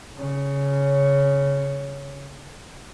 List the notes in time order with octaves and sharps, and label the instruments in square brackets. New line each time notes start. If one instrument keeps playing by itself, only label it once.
[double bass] C#3 C#4